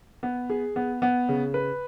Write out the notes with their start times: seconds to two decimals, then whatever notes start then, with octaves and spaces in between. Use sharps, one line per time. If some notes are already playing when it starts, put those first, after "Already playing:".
0.23 B3
0.50 G#4
0.76 B3
1.02 B3
1.29 C#3
1.54 B4